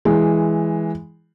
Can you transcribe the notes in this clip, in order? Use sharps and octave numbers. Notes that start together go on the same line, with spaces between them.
E3 G#3